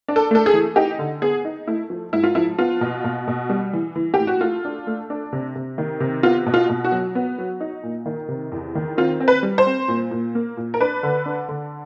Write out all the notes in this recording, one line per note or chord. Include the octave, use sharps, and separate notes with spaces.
D4
A4
A3 A4
G#4
E3
D#4 G4
D3
B3 G#4
D#4
A3 E4
F3
G#2 E4
F4
F3 E4
B3 F4
B2
B2
B2
G3
E3
E3
A2 G4
F#4
A3 F4
D4
A3
D4
C3
C3
D#3
C3
B3 F4
B2
F4
B2
F#4
F#3
B3
F#3
D#4
A#2
D#3
C3
E2
D#3
C4 F4
C4
B4
G3
C5
C4
A#2
A#2
A#3
A#2
A#4
D4 B4
D3
D4
D3